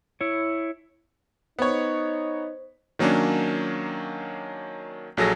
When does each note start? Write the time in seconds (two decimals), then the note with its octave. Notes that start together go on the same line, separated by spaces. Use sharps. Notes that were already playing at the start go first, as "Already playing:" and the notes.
0.21 E4 C#5
1.59 B3 D#4 C5 C#5
2.99 D#3 F#3 A#3 C#4 D4
5.17 A#1 F#3 G#4 A4 A#6